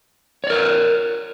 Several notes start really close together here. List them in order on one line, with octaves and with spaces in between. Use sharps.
C#5 D5 A#4